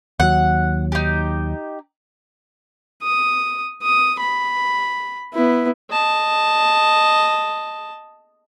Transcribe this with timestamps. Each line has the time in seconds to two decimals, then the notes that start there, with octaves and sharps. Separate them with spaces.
0.20 D#2 F#3 F#5
0.92 D#4 G4
3.03 D#6
3.83 D#6
4.20 B5
5.34 B3 E4
5.91 D#5 A5